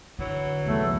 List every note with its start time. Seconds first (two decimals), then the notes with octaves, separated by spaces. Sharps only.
0.19 D3 E3 F#3
0.65 B1 E2 C3 A3